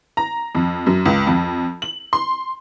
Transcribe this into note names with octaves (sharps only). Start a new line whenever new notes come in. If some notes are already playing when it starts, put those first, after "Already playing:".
A#5
F2
F#2
C#2
F2
F#7
C6